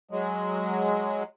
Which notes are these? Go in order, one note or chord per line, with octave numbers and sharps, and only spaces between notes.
F#3 G#3